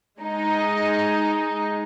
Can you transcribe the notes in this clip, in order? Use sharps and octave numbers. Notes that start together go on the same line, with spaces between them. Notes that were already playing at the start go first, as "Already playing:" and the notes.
G#3 D#4